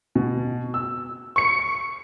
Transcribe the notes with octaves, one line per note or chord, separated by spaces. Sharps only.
B2
E6
C#6 C#7